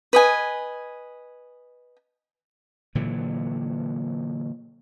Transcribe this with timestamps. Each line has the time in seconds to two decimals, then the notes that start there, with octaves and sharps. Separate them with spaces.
0.13 B4 D#5 G#5
2.95 A#2 D3 E3 F#3